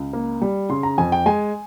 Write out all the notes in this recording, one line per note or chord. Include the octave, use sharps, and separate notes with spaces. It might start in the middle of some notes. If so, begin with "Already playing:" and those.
Already playing: C#2
A#3
G3
C#3 C6
A#5
F2 G#5
G5
G#3 G#5